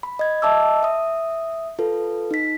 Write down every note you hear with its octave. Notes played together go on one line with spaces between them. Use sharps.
B5
D#5 G#6
D#5 E5 A5 D6 E6
E5 D#6
F4 A4 B4
D#4 B6